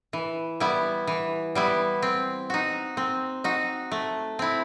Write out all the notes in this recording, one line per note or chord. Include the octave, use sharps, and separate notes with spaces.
E3
G3 B3 E4
E3
G3 B3 E4
C4
D#4 F#4
C4
D#4 F#4
A3
C4 E4